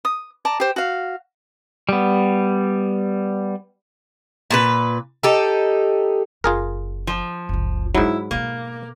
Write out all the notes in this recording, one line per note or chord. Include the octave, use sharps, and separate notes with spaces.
D#6
D5 A5 A#5
G4 C5
F#4 F5
G3 B3
A#2 G#4 B4
D#4 G4 A4
F#1 F4 G#4 A#4
F3
F#1 C#2
G#2 F#3 E4
B2 A#3 B3